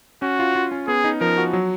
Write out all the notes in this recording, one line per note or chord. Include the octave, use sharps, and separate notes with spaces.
C#4 F#4
F4
F4
C#4
B3 G#4
D#4
F3 A#4
F#4
F#3